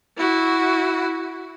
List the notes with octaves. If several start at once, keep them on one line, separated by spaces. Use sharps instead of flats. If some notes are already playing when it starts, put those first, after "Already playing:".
E4 F#4